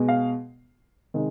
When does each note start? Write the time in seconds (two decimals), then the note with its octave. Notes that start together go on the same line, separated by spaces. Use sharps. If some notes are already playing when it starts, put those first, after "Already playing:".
Already playing: B2 G#3
0.09 F5
1.14 C3 D#3 G#3